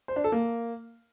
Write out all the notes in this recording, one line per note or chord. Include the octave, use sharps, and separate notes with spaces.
C5
D4
A4
A#3